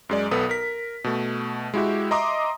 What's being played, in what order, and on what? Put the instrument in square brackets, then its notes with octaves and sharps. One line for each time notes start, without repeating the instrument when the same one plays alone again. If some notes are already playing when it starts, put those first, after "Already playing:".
[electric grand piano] F#2 G#3 D5
B1 B3 A4 B4 D#6
A#4 B6
B2 A3
G#3 E4 F#4 G4 E5
D#5 E5 A#5 C6 D6 D#6